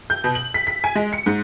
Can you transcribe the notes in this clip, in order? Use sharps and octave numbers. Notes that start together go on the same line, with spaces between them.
G6
B2
F#7
B6
B6
G#5
G#3
C#7
G#2